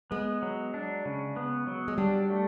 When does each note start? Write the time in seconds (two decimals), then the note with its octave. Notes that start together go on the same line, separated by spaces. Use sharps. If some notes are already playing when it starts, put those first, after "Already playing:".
0.11 G#3 B3
0.42 F#3
0.74 D4
1.05 C#3
1.36 B3
1.67 F#3
1.88 G#3
1.98 G3 D4
2.30 A3